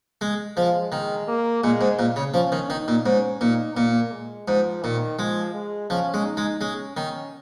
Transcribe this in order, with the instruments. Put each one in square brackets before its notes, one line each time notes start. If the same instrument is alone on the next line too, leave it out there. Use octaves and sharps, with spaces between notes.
[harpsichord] G#3
[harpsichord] F3 [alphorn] G#3
[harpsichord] D#3 [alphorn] G#3
[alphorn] A#3
[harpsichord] A#2 [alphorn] G#3
[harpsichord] G#2
A#2
C#3
[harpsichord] F3 [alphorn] C#4
[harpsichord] D#3
[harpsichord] D#3 [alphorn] D#4
[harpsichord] A#2
[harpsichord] G#2 [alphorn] C#4
[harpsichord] A#2 [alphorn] D#4
[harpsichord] A#2 [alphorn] A#3
[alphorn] G#3
[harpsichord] G#2 [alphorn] F3
[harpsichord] A#2 [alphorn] D#3
[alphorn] F3 [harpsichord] G#3
[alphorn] G#3
[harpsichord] F3 [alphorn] C#4
[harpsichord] G#3
[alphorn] D#4
[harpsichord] G#3
[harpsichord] G#3 [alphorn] C#4
[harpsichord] D#3 [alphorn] C#4